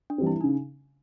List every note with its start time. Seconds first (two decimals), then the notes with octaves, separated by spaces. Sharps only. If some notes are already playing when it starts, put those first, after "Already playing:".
0.10 D4
0.18 E3 G3 C4
0.27 E4
0.41 C#3 D#4